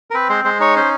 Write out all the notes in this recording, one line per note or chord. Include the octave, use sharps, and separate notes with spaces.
A#4
C4 B4
G#3 C5
G#3 C5
D#4 C#5
C#4 C5